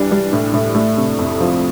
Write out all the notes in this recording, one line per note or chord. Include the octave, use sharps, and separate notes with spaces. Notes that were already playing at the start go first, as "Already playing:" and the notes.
Already playing: E3 G3 D4
G3
A2
A2
A3
C3
F2
F3